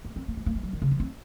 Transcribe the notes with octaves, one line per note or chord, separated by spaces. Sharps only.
A#3
C4
A#3
G#3
A#3
G#3
G3
D#3
C#3
F3
C4